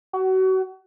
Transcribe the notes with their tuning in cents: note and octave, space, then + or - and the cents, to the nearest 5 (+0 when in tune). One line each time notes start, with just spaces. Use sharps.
F#4 +30